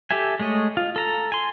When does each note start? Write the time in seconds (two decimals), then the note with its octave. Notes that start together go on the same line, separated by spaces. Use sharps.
0.11 G4 A4 E5 G#5
0.40 G#3 A3 C#5 D#5
0.77 F4
0.96 A4 A#5
1.32 G#5 C6